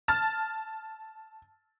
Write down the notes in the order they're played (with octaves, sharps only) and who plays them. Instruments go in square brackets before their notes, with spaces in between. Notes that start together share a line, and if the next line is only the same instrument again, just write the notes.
[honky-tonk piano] A5 F6 A6